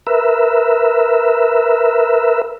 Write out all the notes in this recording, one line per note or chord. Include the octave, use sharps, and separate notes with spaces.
A#4 B4 E5